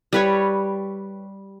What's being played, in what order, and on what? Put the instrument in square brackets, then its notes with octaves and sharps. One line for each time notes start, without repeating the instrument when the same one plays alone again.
[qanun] G3 B4 C#5